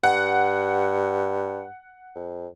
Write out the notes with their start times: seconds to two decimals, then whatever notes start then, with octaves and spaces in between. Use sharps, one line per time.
0.04 G2 F#5
2.15 F2